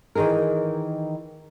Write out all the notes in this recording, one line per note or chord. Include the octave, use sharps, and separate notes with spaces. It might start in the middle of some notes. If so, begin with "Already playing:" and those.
D#3 E3 D#4 G#4 A#4